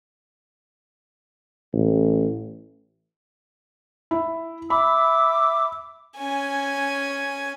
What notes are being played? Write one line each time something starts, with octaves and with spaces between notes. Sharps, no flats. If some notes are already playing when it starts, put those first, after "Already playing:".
A1
E4
E5 B5 D6 E6
C#4 G#5